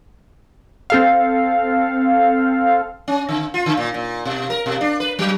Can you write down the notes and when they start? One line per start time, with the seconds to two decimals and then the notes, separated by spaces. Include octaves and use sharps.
0.90 C4 A4 F5
3.08 C#4
3.29 D3
3.54 F4
3.66 D3
3.77 A#2
3.94 A#2
4.25 B2
4.50 A#4
4.66 B2
4.81 D4
5.00 B4
5.19 F#3